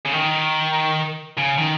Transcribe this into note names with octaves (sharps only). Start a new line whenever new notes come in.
C#3
D#3
C#3
D#3